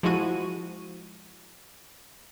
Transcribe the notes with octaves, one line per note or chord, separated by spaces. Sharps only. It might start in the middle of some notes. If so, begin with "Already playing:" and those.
F3 G#3 E4 F#4 D#7